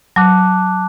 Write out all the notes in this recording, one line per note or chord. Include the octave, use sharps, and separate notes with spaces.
F#3 A5 D6 F#6